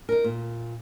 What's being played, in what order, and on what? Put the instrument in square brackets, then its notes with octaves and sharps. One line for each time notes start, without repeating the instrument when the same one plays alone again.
[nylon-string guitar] D#4 A#4
A#2